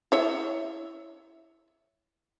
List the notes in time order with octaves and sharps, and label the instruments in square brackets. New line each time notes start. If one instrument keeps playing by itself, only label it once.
[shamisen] E4 C#5 E5